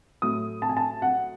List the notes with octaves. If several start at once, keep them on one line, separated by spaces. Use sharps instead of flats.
A2 F#3 D#6
A5
G#5
A5
F#5